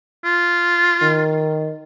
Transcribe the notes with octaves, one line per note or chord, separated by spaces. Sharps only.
F4
D#3